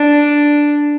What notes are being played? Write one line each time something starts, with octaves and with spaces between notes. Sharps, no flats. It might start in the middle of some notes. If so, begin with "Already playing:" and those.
Already playing: D4